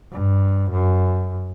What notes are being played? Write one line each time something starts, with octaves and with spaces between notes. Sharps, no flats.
G2
F#2